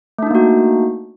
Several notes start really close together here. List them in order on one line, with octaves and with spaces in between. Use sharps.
A3 D4 D#4 A#3 F#4